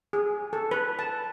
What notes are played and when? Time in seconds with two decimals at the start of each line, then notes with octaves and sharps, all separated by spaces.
0.13 G#4
0.53 A4
0.71 B4
0.99 A5